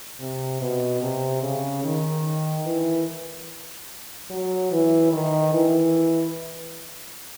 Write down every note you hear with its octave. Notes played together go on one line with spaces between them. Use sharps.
C3
B2
C3
C#3
D#3
E3
F#3
E3
D#3
E3